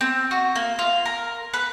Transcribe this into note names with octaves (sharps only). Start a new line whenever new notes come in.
C4
F#4
A#3
F4
A#4
B4